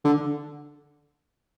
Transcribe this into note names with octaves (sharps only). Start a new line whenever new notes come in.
D3